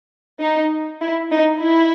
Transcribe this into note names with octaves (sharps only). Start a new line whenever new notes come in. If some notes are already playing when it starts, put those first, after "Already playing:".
D#4
E4
D#4
E4